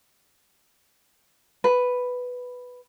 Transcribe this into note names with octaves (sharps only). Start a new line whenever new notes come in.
B4